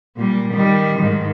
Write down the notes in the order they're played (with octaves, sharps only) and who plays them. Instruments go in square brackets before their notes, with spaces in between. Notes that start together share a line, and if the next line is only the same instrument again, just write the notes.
[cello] A#2 G3
D#3 G3
G#2 D#3